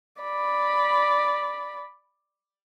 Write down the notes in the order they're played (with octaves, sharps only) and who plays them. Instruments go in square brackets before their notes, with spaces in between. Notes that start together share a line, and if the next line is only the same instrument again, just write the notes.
[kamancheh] D5 B5